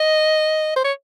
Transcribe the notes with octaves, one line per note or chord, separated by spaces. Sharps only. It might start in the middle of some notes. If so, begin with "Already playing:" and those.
Already playing: D#5
C5
C#5